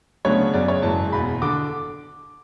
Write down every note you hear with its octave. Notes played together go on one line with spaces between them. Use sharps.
D2 C#3 F#3 B3 D4 C#5
F#2 C#3 F#3 B3 D5
C#5
F#1 F#2 E3 G#3 A5
F#1 E2 B2 B5
D3 D6